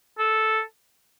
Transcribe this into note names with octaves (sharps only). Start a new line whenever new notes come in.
A4